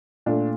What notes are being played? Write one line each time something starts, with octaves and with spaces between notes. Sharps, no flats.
A#2 A3 D4